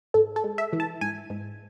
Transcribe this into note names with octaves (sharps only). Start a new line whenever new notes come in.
G#2 A4
A4
G#3
E5
E3
A5
G#2 G#5
G#2